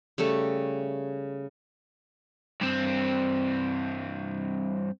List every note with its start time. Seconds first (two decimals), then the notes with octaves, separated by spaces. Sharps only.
0.18 C#3 G3 A3 A4
2.61 G2 C4